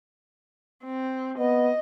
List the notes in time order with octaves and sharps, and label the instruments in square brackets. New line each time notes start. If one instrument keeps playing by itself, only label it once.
[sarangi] C4
[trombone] B3 [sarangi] D#5